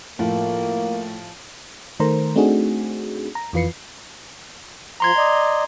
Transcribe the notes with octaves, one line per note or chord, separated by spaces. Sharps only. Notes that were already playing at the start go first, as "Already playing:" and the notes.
A2 F3 A#3
D#3 A3 A#4 C5 A#5
A3 C4 D4 D#4 F#4 G#4
A#5
F2 E3 F4 B4 C7 C#7
F3 A#5 C6 G#6
D5 D#5